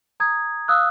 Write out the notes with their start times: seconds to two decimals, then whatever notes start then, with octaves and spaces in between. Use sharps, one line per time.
0.20 A#5 D#6 G#6
0.68 F5 D#6 E6 F#6